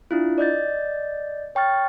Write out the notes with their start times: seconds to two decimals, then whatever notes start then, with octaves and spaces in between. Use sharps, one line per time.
0.11 D4 E4 F4
0.38 D5 D#5 G6 A6
1.55 C#5 G5 C#6 F6 A6